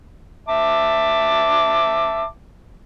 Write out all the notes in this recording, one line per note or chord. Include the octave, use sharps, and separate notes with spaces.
E5 A5 D6